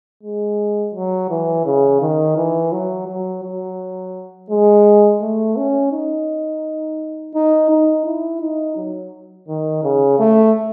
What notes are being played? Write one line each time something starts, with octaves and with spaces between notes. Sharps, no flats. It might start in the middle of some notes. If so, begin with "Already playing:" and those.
G#3
F#3
E3
C#3
D#3
E3
F#3
F#3
F#3
G#3
A3
C#4
D#4
D#4
D#4
E4
D#4
F#3
D#3
C#3
A3